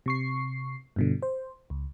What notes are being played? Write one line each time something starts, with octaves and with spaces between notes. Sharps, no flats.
C3 C#6 C7
G2 B2 D3
C5
C#2